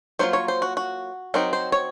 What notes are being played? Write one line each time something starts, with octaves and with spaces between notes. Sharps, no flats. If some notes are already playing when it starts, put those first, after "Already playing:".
F#3 A#3 F4 C5
C#5
C5
F#4
F#4
F#3 C4 D#4 A#4
C5
C#5